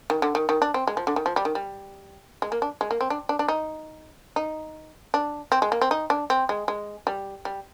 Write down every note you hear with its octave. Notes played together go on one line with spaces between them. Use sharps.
D#3
D3
D#3
D#3
D4
C4
G#3
F3
D3
D#3
F3
G3
D#3
G3
G#3
A#3
D4
G#3
A#3
C4
D4
D4
D4
D#4
D#4
D4
C4
G#3
A#3
C4
D#4
D4
C4
G#3
G#3
G3
G3